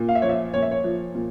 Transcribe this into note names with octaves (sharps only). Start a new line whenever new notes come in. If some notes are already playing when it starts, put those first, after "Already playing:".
Already playing: A#2
F5
E5
F3 C#5
E5
A#2 C#5
E5
C#5
F3
A#2